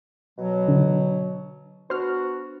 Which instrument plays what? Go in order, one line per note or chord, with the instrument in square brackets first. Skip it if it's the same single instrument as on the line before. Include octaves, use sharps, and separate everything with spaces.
[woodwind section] B2 F#3
[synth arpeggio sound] D3
[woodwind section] B3 D4 F#4 [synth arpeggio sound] C5 F6